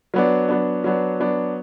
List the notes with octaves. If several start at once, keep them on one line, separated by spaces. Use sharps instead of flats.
F#3 B3 D4
F#3 B3 D4
F#3 B3 D4
F#3 B3 D4